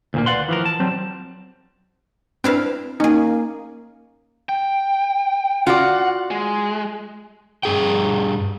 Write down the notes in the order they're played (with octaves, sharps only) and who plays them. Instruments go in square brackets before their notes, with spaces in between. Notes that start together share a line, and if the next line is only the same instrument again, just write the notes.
[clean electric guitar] D2 A#2 A#3
B4 D5 F5 F#5 C6
E3 F3 A#4
A5
F#3 G3 C4
[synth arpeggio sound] C4 B4 [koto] D4 E4 F5
[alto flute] A#3 [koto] C#4 G#4 [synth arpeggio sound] D#4
[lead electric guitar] G5
[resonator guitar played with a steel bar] F4 F#4 D5 [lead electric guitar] F#5
[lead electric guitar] G#3
[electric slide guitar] G2 G#4 G5